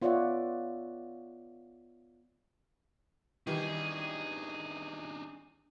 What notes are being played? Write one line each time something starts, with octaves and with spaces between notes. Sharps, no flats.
B3 F4 C#5 D5 E5 F#5
D#3 E3 G3 D4 D#4 G#4